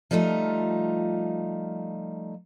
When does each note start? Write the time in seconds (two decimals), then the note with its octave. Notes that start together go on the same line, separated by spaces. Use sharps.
0.11 F3 G3 A3 D#4 F4